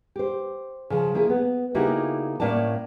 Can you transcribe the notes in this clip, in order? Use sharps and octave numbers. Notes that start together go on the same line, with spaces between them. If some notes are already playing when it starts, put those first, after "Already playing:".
G4 C5
C#3 F3
F3 A#3 E4 G#4
B3
C#3 A#3 D#4 E4 F#4 G4
A2 A#3 C#4 D5 A5